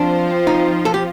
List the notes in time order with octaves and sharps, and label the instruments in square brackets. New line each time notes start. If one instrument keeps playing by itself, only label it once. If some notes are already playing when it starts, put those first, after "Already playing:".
Already playing: [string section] F3 C4 F4 C5 [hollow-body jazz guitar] D4
[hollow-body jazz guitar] D#4
A4
G4